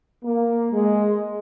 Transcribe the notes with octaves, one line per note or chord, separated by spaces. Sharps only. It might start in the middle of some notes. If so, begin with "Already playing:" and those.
A#3
G#3